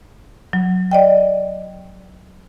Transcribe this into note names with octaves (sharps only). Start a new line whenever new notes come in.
F#3
D5 D#5 G5